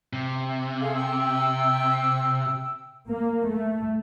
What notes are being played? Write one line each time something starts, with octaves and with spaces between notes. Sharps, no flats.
C3
G#4 A4 F5
G5 E6
A#3
A3